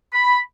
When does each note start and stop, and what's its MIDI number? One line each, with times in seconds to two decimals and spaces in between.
0.13 0.39 83